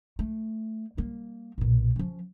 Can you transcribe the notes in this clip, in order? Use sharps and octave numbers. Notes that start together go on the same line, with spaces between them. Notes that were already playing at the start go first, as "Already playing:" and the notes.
A3
G3 A#3
B1 A#2
F3 C#4